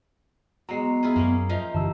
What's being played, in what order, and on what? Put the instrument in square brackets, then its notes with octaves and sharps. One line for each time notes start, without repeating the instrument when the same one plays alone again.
[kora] F#3 G#3 [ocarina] B3 [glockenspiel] A#5 C7
[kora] E4 F4 G#4
[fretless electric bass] F#2 [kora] A#3 C#4
[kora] F3 D#4 F5 [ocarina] E5
[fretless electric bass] F#1 D3 E3 [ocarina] G4 [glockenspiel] A5 E6